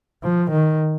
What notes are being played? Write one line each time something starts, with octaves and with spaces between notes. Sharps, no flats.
F3
D#3